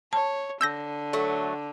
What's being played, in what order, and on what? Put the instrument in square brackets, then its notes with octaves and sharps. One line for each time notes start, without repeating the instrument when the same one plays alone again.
[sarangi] C#5 [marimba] A5
[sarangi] D3 [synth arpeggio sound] E6 G6 A#6
[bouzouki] F#3 A3